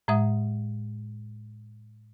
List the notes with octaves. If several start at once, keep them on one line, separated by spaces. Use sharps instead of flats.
A2 G#3 E5 D#6